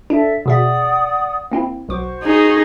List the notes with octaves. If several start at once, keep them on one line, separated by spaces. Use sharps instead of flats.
D4 A4 E5
B2 G#4 D5 E5 F#5 D#6
A#3 C4 E4
B1 F#4 C5 C#6 D6
D#4 G#4